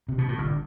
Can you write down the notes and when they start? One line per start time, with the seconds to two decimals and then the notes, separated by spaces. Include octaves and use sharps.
0.08 C3
0.18 B2
0.28 A2
0.38 G1 G2